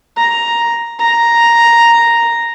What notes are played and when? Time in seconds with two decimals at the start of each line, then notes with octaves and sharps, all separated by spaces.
0.17 A#5
0.99 A#5